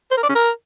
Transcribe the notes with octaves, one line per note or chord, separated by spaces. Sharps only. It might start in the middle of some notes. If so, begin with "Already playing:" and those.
C5
A#4
D5
C#4
A#4